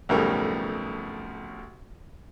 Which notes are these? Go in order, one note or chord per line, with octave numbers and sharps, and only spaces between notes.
B1 F2 A2 C#3 G3 A#4